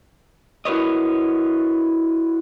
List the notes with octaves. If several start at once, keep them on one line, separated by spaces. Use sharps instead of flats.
E4 F#4 A#4 B4 C#5 D#5